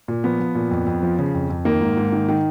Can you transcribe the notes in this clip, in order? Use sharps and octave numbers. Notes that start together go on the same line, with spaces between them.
A#2
F3 B3
F3
A#2
F2
F2
F3
C#3
F2
F2
D#3 A#3
G#2
G#2
D#3
D#3